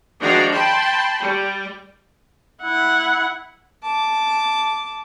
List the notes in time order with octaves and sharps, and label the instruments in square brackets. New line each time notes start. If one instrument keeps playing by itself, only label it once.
[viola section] D#3 F3 G#3 D4 F#4 A#5
G5 A5 B5 C6
G3
[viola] E4 F#5
[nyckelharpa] A5 D6